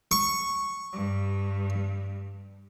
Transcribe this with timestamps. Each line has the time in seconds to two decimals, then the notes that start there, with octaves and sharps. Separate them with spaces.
0.11 C#6
0.92 G2